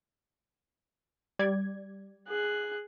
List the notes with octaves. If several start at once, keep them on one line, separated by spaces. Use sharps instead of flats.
G3 D5 G#6
G#4 F#6